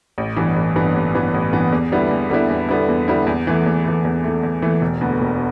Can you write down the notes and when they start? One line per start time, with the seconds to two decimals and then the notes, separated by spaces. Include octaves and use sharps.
0.18 A1
0.36 G2 E3 B3
0.56 A1
0.76 G2 E3 B3
0.95 A1
1.15 G2 E3 B3
1.34 A1
1.53 G2 E3 B3
1.72 E2
1.92 D3 G3 B3 E4
2.11 E2
2.30 D3 G3 B3 E4
2.50 E2
2.69 D3 G3 B3 E4
2.89 E2
3.08 D3 G3 B3 E4
3.27 E2
3.47 E3 A3
3.66 E2
3.85 E3 A3
4.05 E2
4.24 E3 A3
4.43 E2
4.62 E3 A3
4.82 E1
5.01 D2 D3 B3
5.21 E1